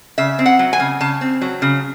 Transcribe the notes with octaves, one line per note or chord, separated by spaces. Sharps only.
C#3 E5
C4
F#5
F#3
G#5
C#3
C#3 A5
C4
F#3
C#3